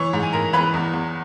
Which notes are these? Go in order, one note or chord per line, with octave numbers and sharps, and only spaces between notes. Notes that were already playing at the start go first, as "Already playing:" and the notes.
Already playing: E3 C#5 C#6
G#2
G#5
G#2 A#4 A#5
E3 B4 B5
E2
E2